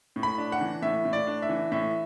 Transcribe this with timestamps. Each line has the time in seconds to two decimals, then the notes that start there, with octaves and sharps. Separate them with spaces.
0.16 A2
0.23 B5
0.38 D4
0.52 F#5
0.61 E3
0.82 A2 E5
1.05 A2
1.13 D5
1.27 D4
1.42 E5
1.49 E3
1.72 A2 E5